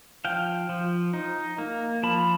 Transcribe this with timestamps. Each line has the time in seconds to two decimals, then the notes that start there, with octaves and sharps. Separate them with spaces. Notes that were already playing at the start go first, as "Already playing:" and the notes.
0.25 F3 F5 G5
0.69 F3
1.13 D#4
1.58 A#3
2.03 F3 A5 B5